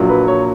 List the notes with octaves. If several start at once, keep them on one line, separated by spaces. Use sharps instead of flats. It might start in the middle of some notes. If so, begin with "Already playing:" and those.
Already playing: A#1 A#2 F#3 A#3
B4
C#5